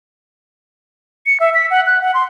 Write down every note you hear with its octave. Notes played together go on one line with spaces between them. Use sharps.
C#7
E5
B6
F#5
F#6
F#5
C6